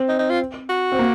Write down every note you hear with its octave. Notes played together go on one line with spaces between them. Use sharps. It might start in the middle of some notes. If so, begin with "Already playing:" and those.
Already playing: C4
D#4
D#4
F4
F#4
C4
A#3